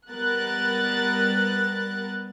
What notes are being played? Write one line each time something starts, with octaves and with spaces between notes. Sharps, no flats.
G3 B3 A#4 F#6 A6